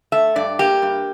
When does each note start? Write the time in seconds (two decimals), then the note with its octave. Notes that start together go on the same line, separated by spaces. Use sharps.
0.12 A3 E5
0.36 G2 D5
0.59 A#3 G4
0.82 G2